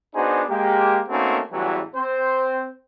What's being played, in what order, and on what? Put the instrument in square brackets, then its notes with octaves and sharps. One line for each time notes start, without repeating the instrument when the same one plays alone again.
[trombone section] B3 D4 D#4 F#4 G#4 C5
G#3 A#3 G4
A3 A#3 C4 C#4 D#4 F#4
A1 E2 E3 F#3 G3 F#4
C4 C5